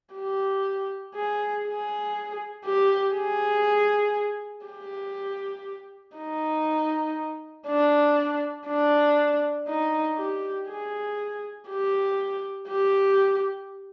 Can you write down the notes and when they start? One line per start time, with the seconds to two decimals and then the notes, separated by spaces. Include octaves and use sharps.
0.15 G4
1.15 G#4
1.65 G#4
2.65 G4
3.15 G#4
4.66 G4
6.16 D#4
7.67 D4
8.67 D4
9.68 D#4
10.17 G4
10.68 G#4
11.69 G4
12.68 G4